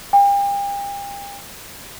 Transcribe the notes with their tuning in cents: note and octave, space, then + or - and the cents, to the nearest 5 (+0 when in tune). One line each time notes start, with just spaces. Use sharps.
G5 +40